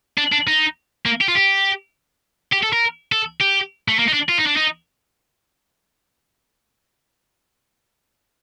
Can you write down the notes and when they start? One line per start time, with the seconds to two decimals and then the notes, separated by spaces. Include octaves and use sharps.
0.18 D4
0.32 D4
0.47 D#4
1.06 A#3
1.21 G4
1.28 F4
1.35 G4
2.52 G4
2.63 A4
2.72 A#4
3.12 A4
3.41 G4
3.88 A3
3.99 A#3
4.08 D#4
4.14 D4
4.29 F4
4.38 D#4
4.47 D4
4.57 D#4